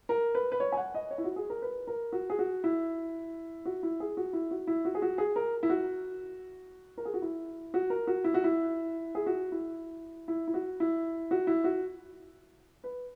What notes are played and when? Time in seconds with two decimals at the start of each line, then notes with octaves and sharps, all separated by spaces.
0.09 A#4
0.35 B4
0.52 B4
0.60 C#5
0.72 G#5
0.77 F#5
0.94 D#5
1.11 C#5
1.18 E4
1.24 F#4
1.36 G#4
1.50 A#4
1.62 B4
1.87 A#4
2.12 F#4
2.30 G#4
2.39 F#4
2.64 E4
3.65 F#4
3.83 E4
4.00 G#4
4.17 F#4
4.33 E4
4.51 F#4
4.67 E4
4.85 F#4
4.95 G#4
5.02 F#4
5.18 G#4
5.36 A#4
5.63 E4
5.69 F#4
6.98 A#4
7.05 G#4
7.14 F#4
7.22 E4
7.74 F#4
7.90 A#4
8.07 F#4
8.24 E4
8.34 F#4
8.44 E4
9.15 G#4
9.26 F#4
9.52 E4
10.28 E4
10.47 E4
10.54 F#4
10.80 E4
11.31 F#4
11.47 E4
11.64 F#4
12.84 B4